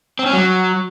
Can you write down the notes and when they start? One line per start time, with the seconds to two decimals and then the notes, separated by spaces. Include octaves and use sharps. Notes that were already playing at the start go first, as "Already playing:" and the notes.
0.19 C4
0.26 C#4
0.33 F#3